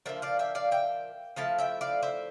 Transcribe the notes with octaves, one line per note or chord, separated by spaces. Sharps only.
A#2 F3 A#3 D4 C5 E5
D5 F5
E5 G5
D5 F5
E5 G5
F3 A3 E4 F5 A5
E5 G5
D5 F5
C5 E5